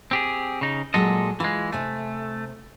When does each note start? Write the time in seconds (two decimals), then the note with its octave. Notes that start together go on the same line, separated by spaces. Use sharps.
0.11 C4 G4 G#4
0.61 C#3 D#4
0.94 A#2 F#3 G#3 A4 D#5
1.40 E3 G#3 F4
1.72 C3 A3 G#5